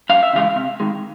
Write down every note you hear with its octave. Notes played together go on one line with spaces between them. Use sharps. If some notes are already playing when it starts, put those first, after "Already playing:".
F#2 F5
E5
C#3 E3 G#3 F5
C3
D#3 G#3